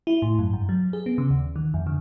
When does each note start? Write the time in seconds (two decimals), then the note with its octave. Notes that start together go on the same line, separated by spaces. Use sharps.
0.07 E4
0.22 A2
0.39 F#2
0.53 G2
0.69 F#3
0.93 G#4
1.06 B3
1.18 C#3
1.30 D#2
1.56 D#3
1.74 F2
1.87 D3